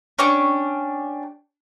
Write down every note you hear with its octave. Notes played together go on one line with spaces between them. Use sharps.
C#4 D4 G4 C#6